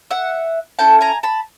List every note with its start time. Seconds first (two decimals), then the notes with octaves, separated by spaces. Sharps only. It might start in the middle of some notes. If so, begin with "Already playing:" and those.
0.11 E5 F#5
0.79 C#4 E4 A4 G5 A5
1.01 G#5 A#5
1.23 A5 B5